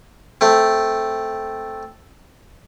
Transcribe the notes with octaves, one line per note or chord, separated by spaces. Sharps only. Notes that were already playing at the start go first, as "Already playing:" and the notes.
A3 C4